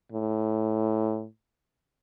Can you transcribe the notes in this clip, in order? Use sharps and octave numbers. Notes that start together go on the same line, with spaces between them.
A2